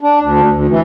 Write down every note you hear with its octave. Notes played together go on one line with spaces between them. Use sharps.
D4
D2
D2
E3